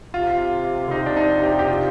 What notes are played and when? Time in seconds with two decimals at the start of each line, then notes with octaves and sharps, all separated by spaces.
0.14 C3 F4
0.87 D3
0.91 C3 D#4
1.06 D4
1.17 D#4
1.43 G4
1.59 G4
1.68 C3 F4